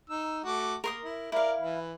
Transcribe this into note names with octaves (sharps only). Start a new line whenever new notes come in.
D#4 E6
A3 F#4 D6
A#3 A#4 C6 D#6
E4
E4 A#4 D5 F5
E3 B4